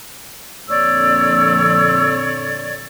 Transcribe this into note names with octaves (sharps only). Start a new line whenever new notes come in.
F2 A#2 D3 C#5 D5 E6